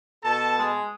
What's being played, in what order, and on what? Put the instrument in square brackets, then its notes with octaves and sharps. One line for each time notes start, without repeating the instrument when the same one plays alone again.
[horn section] B2 A5 [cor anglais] A4
[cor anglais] G#3